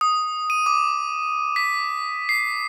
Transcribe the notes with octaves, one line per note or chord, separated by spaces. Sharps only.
D#6
D#7
D6
B6
C7